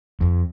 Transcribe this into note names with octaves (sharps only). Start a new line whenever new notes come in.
F2